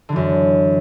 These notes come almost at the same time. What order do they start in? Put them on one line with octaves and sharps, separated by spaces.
D3 E3 F#2